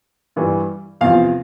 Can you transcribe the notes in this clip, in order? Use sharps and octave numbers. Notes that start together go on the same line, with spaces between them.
G2 E3 G3
E2 C3 F3 F5